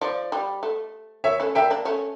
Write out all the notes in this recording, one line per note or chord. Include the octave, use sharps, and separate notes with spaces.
F3 D5
G3
A3
A#3 C#5 E5
A3 C#4
A#3 D4 E5 G5
A#3 D4
A3 C#4